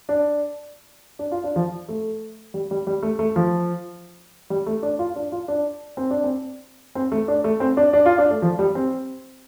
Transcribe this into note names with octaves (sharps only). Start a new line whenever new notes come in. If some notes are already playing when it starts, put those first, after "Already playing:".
D4
D4
F4
D4
F3
A3
G3
G3
G3
A3
A3
F3
G3
A3
D4
F4
D4
F4
D4
C4
D4
C4
C4
A3
D4
A3
C4
D4
D4
F4
D4
A3
F3
G3
C4